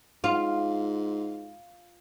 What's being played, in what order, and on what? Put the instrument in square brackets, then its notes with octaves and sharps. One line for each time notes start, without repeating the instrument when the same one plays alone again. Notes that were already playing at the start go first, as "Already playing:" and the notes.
[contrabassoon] G#2 [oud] F4